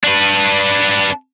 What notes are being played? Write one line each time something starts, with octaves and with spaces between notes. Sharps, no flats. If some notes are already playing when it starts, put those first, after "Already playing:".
D4 B4